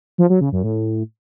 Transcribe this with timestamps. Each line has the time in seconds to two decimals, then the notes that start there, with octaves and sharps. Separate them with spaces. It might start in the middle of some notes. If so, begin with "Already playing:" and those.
0.18 F3
0.30 F#3
0.41 C#3
0.52 F#2
0.64 A2